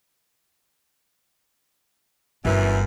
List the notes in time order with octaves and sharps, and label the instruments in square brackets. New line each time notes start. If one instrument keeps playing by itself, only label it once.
[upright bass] G1 [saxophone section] F#2 E3